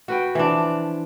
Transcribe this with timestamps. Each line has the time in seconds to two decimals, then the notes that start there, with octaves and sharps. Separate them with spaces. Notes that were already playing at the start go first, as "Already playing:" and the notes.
0.08 F#4 B4 G5
0.35 E3 F3 D4